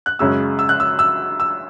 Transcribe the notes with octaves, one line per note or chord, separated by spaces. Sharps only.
F#6
F#2 C#3 G#3 C#4 E6
E6
F#6
E6
E6
E6